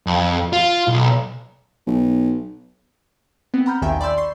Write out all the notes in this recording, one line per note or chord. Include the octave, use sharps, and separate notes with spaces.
F2
F4
B1
B1
B3 C4
F#5 A#5 B5 F6 G6
A#1 D#2 D#3 E5 G5 G#5
D5 B5 C6 E6 G6
C6 C#6 C7